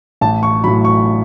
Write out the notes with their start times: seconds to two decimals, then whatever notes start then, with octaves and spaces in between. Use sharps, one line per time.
0.21 A1 A5
0.43 C#6
0.64 A2 F#3 B5
0.85 C#6